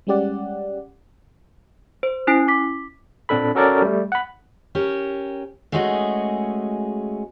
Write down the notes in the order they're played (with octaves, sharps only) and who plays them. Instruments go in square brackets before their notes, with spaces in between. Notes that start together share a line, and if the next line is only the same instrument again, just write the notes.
[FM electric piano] G3 G#3 C#4 G4 D5 F#5
[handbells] C5
C#4 E4 G#5 C7
D6 B6
[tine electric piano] A#2 C4 D4 A4 B5
C#4 F#4 A4 A#4 C#5 D5
G3 A3
F#5 B5
[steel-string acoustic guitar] C#4 G4 A#4
G#3 A3 C#4 D#4 F#4 G#4